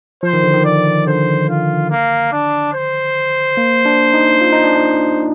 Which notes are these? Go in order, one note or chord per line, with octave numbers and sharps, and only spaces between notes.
F3 C5
D#3
D3
D#3
D5
D3 C5
F4
A#3
D4
C5
A#3
D4
D#4
F4
D#4
D4
D#4